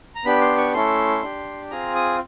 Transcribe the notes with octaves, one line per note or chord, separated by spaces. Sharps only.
A#5
B3 D4 G4 B5
C6
C#6
A3 C#4 E4 A4 C6
D4 G4
C4 F4 G#4 A#5
D#6